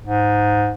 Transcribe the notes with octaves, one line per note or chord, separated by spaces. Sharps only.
G#2